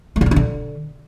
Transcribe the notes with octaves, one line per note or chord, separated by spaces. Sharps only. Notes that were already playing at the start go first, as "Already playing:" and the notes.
A3
D3
C4
D4
D3